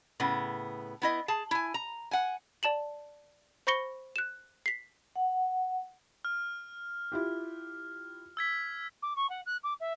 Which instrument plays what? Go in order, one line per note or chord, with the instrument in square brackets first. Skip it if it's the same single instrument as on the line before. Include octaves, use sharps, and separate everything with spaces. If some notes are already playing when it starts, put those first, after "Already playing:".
[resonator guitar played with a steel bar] A2 C#3 B3
B3 E4 D#5
G#4 A5
E4 G#5
A#5
F#5 G#5
[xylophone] D5 A5 E7 F#7
C5 B5 C#6 A#6 C#7 G7
F#6 E7
B6 C7
[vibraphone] F#5
[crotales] F6
[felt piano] E4 F4 G4
[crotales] E6 G#6 B6
[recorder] D6
C#6
F#5
F#6
D6
E5